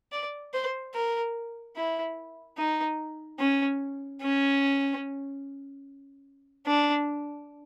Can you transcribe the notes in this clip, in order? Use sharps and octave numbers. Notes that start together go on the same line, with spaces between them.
D5
C5
A#4
E4
D#4
C#4
C#4
D4